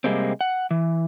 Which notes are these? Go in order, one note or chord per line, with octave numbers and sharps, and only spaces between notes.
C3 G3 G#3 A#3 C4
F#5
E3